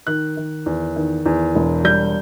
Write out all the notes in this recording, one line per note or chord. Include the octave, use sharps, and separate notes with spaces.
D#3 F#6
D#3
E2
D#3
E2
E1
G3 G6